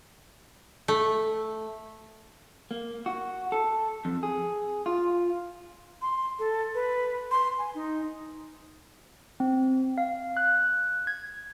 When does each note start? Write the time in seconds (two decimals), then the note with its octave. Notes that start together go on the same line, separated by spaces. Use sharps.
0.88 A3
2.71 A#3
3.06 F#4
3.52 A4
4.05 F2
4.23 G#4
4.86 F4
6.02 C6
6.39 A4
6.75 B4
7.31 C6
7.58 G#5
7.75 D#4
9.40 C4
9.98 F5
10.37 F#6
11.07 G#6